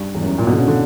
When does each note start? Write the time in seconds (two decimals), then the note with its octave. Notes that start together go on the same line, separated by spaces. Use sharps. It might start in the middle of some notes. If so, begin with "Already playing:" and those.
Already playing: G2
0.15 E2
0.22 F#2
0.38 A#2
0.47 B2
0.53 D3
0.57 C#3
0.68 D3